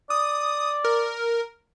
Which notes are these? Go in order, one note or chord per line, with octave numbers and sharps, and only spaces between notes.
D5 D#6
A#4